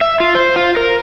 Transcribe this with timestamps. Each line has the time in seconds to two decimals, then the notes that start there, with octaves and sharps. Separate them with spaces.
0.01 E5
0.20 F4
0.35 C5
0.56 F4
0.77 A#4